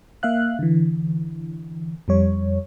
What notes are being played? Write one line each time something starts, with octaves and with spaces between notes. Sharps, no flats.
A#3 E5 F5 F#6
D3 E3
F2 G3 C#5